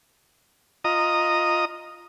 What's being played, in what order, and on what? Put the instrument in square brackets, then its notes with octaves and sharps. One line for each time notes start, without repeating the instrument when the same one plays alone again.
[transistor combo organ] F4 D#5 A#5 D#6